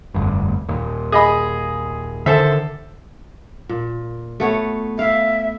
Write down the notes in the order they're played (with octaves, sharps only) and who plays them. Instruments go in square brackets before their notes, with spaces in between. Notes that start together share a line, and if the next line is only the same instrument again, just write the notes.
[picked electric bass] F1 D2 G2
D#2 A#2
[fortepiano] G#4 D#5 B5
[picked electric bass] D3 D#3 [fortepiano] A4 C5 E5
[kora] A#2
A3 B3 C#5
[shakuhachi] E5 [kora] F5